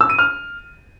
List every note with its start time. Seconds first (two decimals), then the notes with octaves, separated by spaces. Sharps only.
0.01 E6
0.10 D#7
0.19 F6